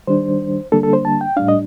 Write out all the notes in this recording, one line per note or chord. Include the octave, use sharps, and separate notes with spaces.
D#3 G3 D4 C5
D3 G3 A#3 D4 A4
A4
C5
A5
G5
A2 G3 D4 F5
D#5